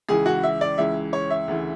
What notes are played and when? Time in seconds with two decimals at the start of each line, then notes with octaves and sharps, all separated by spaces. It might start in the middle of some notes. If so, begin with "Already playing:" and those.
0.09 C#2 C#3 E3 G#4
0.26 F#4
0.43 E5
0.61 D5
0.78 C#2 C#3 E3 E5
1.13 C#5
1.30 E5
1.48 D2 C#3 E3